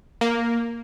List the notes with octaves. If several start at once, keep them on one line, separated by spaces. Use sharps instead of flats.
A#3